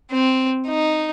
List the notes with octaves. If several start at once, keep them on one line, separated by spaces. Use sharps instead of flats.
C4
D#4